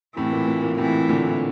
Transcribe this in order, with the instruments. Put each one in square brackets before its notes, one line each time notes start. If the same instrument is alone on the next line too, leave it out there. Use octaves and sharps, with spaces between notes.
[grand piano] A2 C3 [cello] E3
[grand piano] A#2
A#2
A#2
[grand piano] A2 C3 [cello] E3
[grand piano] A#2 D3